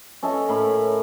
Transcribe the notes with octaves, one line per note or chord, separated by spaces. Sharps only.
C#4 A4 D#5 E5
A2 A#4 B5